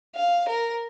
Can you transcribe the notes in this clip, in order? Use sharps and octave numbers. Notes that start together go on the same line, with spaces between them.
F5
A#4